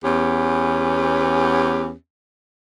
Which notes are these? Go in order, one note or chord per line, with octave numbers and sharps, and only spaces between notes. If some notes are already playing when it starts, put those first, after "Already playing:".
E2 B3 C#4 G4